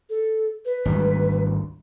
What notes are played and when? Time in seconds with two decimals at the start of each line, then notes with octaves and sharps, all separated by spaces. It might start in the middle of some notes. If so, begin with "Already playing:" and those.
0.10 A4
0.65 B4
0.85 G#1 D2 G3